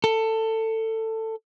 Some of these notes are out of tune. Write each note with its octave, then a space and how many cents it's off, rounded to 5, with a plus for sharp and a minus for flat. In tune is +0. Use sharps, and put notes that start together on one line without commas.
A4 +20